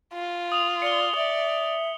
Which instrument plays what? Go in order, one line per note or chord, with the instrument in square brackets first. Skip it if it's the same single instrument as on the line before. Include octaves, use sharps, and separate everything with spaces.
[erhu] F4
[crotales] D#6 F7
[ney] D5 [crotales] C#7 G7
[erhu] D5 [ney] E5 [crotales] F#7